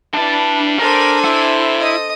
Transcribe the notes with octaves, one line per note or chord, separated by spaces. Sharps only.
G3 D4 E4 B4 A5
D4 A4 A#4 C5 G#5
C3 E4
D#5 D#6